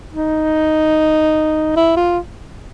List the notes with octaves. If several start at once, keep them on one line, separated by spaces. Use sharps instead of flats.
D#4
E4
F4